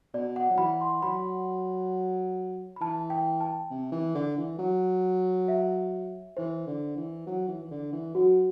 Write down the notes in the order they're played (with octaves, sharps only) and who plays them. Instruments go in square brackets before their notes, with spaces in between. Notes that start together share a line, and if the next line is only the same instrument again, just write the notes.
[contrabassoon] B2 [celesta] D5
[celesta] F#5
[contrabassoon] F#3
[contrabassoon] E3 [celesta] B5
[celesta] C6
[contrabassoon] F#3 [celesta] B5
[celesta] B5
[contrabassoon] E3 [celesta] A5
[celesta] G5
A5
[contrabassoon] C3
E3
D3
E3
F#3
[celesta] E5
[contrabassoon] E3 [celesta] C5
[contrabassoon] D3
E3
F#3
E3
E3
D3
E3
[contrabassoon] F#3 [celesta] F#4